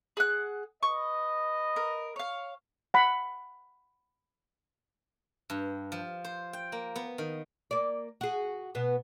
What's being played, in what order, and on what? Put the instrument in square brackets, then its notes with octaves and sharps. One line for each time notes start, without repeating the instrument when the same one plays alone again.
[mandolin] G#4 F#5 F#6
[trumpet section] B4 D#5 [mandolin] C#6
[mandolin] A#4
C#5 F5
[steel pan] F#5 B5
[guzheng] G2
F3
C5
G5
A#3
B3
D#3
[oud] A#3 D5
F#4 G#4
B2 B3